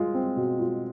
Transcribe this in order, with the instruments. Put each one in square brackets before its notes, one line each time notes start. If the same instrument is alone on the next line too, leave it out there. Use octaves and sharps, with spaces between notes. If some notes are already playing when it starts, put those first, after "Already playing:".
Already playing: [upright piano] G#3 F4
C4
B2
F4